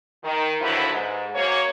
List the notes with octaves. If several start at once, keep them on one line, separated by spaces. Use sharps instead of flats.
D#3
D#2 D3 F3 F#3 E4 B4
G#2
F#2 A#3 C#5